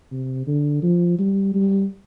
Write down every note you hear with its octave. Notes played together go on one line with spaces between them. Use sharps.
C3
D3
F3
G3
G3